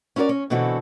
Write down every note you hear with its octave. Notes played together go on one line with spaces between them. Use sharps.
C#4 E4 F#4 A#4 D5
C#4
B2 D3 E3 C4 F#4 A4